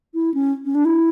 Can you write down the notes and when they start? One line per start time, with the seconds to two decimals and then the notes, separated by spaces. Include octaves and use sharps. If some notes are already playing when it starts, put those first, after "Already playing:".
0.14 E4
0.34 C#4
0.65 C#4
0.75 D4
0.85 E4